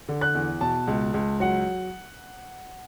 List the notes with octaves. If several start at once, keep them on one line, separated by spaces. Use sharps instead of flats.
D3
F#6
E2
B2 A5
C#2
C#2
F#3 F#5